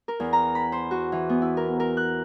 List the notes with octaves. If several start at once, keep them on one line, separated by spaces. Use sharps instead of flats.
A#4
E2
A#5
B5
C5
F#4
E3
B3
E4
A#4
A#4
F#6